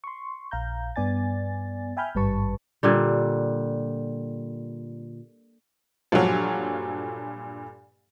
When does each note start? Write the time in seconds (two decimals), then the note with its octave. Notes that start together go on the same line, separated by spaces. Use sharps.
0.04 C6 C#6
0.51 A#1 F5 A#5 G6
0.96 G2 B3 D5 G#5 A6
1.97 E5 G5 G#5 B5 F6 G6
2.15 G#1 G2 G3 B4 A5 C#6
2.83 A#2 D3 G3
6.12 G2 A#2 F3 F#3 A4